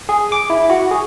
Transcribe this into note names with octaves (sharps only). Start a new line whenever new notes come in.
G#4
D6
E4
F#4
G#4